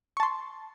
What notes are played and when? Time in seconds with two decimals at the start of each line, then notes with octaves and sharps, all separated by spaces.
0.17 C#6
0.20 A5
0.23 C6